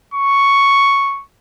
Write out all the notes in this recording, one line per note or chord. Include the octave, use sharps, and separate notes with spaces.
C#6